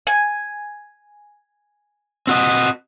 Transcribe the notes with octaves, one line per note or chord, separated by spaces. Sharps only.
G#5
C4 F#4 D#5